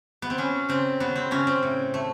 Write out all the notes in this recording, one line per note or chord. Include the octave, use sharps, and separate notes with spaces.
B3
C4
F#3 C#4
C#3 C4
F#3 B3
C4
C#3 C#4
C4
A2
A3